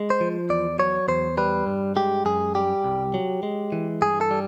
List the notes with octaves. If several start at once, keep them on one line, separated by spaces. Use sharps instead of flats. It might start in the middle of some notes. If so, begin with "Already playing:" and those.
Already playing: G#3
C5
F3
E2 D5
F#3 C#5
E2 C5
G3 B4
G2
G#3 G4
F#2 G#4
G3 G4
C2
F#3
G#3
E3
G2 G#4
A4
G3